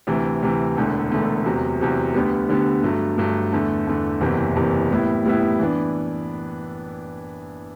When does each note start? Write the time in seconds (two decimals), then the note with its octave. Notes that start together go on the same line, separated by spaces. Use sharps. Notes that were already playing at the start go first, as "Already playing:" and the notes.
0.07 D2 C3 E3
0.43 D2 C3 E3
0.76 E1 E2 D3 A3
1.12 E1 E2 D3 A3
1.45 E2 C3 F#3
1.79 E2 C3 F#3
2.14 D2 D3 G3 B3
2.49 D2 D3 G3 B3
2.83 G2 F#3 A3
3.18 G2 F#3 A3
3.53 E2 D3 A3
3.87 E2 D3 A3
4.21 F#1 E2 C3 E3
4.56 F#1 E2 C3 E3
4.90 A2 G3 B3 E4
5.25 A2 G3 B3 E4
5.60 E3 B3 D4